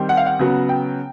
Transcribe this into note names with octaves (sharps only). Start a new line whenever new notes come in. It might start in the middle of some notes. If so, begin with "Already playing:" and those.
Already playing: D#3 G3 C4
F#5
F5
F#5
C#3 F#3 B3
G5